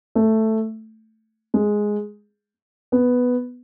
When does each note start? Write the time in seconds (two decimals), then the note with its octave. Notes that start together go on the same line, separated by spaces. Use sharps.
0.15 A3
1.54 G#3
2.92 B3